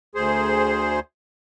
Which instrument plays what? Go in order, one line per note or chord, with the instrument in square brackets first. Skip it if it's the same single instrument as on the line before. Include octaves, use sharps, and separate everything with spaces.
[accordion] D2 G#4 C5